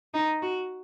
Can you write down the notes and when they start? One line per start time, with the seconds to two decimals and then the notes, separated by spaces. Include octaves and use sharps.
0.14 D#4
0.42 F#4